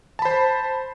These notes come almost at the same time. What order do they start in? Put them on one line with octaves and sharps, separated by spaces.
A5 B5 C5